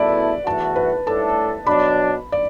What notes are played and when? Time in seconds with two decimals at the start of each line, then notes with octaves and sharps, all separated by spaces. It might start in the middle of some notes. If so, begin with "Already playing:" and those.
Already playing: E2 B2 A3 E4 A4 B4 D5
0.46 E2 E3 A3 F#4 A5
0.76 B4
1.06 A2 A3 D4 A4 A5
1.67 B2 F#3 D4 B5
2.32 D5